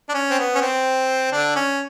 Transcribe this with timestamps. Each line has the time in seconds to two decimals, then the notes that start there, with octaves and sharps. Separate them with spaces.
0.09 D4
0.14 C#4
0.30 C4
0.39 B3
0.55 C#4
0.61 C4
1.32 D3 D4
1.56 C#4